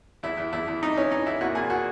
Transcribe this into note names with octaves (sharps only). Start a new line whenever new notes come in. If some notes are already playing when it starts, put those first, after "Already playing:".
E2 E4
E2
E2 E4
E2
E2 D#4
E3 C#4
E3 D#4
E2 E4
A#2 F#4
A#2 G#4
A#2 F#4